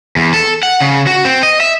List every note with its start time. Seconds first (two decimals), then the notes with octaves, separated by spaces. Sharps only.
0.16 E2
0.34 A4
0.63 F#5
0.81 C#3
1.07 F#4
1.25 C4
1.43 D#5
1.60 E5